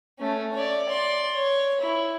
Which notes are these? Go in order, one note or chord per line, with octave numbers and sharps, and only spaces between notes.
A3 C#4
C#5 D5
D5 C6
C#5
E4